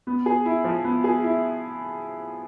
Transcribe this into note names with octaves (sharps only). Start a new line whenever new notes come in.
B3
G#4
E4
F3
B3
G#4
E4